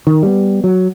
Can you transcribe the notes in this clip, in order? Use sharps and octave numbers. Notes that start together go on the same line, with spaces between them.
D#3
G3 G#3 B3
F#3